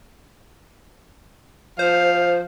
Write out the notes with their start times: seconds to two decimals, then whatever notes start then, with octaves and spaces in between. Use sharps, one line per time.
1.79 F3 C5 F5